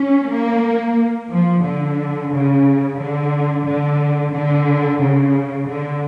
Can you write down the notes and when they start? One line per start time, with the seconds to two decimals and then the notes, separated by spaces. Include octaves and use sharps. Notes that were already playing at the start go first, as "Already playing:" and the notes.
Already playing: C#4
0.31 A#3
1.31 F3
1.64 D3
2.32 C#3
2.99 D3
3.65 D3
4.33 D3
5.00 C#3
5.67 D3